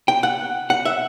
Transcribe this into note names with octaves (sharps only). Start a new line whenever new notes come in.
G5
F#5
F#5
E5